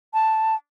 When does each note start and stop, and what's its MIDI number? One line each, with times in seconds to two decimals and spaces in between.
0.14 0.55 81